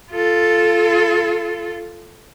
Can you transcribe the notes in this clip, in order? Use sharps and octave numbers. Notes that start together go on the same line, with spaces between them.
F4 A4